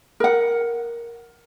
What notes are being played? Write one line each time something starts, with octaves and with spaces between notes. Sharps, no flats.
A#4 F#5